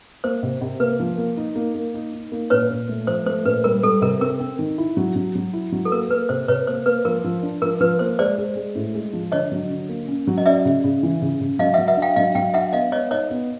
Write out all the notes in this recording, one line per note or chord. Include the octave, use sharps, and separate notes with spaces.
A#3 C5
C3
C3
A#3 B4
F3
A#3
D#4
A#3
A#3
D#4
D#4
A#3
A#2 B4 C#5
A#2
A3
F3 C5
A3 C5
A#2 B4
G3 A#4
G3 A4
C3 A#4
C4 A#4
C4
D#3
E4
F#3
F#3
F#3
E4
F#3
A4
A#3 A#4
A#3 B4
C3 C5
C3 B4 C#5
A#3 C5
A#3 B4
F3 A#4
F3
D4
F3 A#4
F3 B4
A#3 C5
G#3 C5 D5
G#3
G#3
A2
G#3
F3
D3 C#5 D#5
F#3
D3
A#3
C#4
F#3
D#5
C#4 D5 E5
C#3
C#3
E3
C#3
C#3
F#3 D#5 F5
E5 F#5
F#3
E5 F#5
D4
F5 G5
F#3 D#5 F5
F#3 F5 G5
D4 E5 F#5
B3 D#5 F5
B3 C#5 D#5
D#4 C#5 D#5
B3